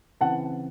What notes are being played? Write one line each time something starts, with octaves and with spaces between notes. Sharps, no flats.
C#3 E3 C4 F#5 A5